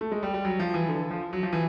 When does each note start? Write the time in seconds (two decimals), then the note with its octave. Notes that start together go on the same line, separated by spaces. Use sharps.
0.01 A3
0.12 G#3
0.23 G3
0.34 G3
0.45 F#3
0.59 F3
0.74 E3
0.88 D3
1.10 F3
1.33 F#3
1.43 F3
1.53 E3